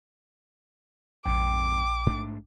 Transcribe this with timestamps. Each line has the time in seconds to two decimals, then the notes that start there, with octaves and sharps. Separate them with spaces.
1.25 A#1 F2 G#2 C3 G5 D6
2.06 G#2 A3 D4